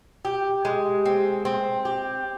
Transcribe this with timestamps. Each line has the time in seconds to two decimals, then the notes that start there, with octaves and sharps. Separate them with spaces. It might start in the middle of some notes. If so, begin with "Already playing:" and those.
0.25 G4
0.65 G#3
1.05 C4
1.45 C4
1.85 G4